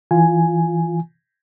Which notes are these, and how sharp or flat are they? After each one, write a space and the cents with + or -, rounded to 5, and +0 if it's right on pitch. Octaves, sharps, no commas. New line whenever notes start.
E3 +0 F4 +0 G#5 +0